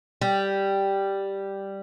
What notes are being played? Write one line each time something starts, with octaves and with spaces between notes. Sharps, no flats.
G3